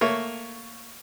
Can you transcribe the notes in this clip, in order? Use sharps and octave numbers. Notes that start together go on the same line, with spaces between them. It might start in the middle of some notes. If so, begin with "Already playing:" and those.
A3 A#3 C#5